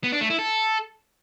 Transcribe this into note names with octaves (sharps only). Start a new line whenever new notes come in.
B3
D4
A3
E4
A4